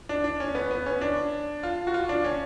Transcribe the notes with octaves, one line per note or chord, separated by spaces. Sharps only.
D4
D4
C#4
B3
B3
C#4
D4
F4
F#4
F4
D4
C#4